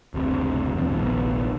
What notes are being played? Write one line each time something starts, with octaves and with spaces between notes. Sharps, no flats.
F#1 D2 C3
E2 G2 F3 C4
F1 A#1 D#3 B3